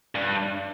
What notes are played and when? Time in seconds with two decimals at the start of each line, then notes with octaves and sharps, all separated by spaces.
0.15 G2